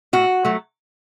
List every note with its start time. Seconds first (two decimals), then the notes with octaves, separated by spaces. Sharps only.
0.13 A2 F#4
0.45 F#3 A3